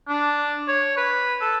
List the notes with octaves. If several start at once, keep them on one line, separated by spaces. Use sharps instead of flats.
D4
C#5
B4
A4